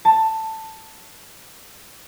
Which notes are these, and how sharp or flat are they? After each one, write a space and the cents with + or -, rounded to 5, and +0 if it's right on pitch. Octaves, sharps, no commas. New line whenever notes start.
A5 +10